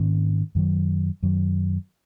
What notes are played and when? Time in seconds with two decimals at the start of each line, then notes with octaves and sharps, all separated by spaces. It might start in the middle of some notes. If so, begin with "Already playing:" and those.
Already playing: G#2 D#3 A#3 C#4
0.55 F#2 D#3 F#3
1.23 F#2 D#3 F#3